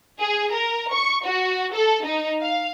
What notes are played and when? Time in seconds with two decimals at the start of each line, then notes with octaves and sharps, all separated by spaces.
0.18 G#4
0.52 A#4
0.92 C#6
1.25 F#4
1.73 A4
2.05 D#4
2.43 F5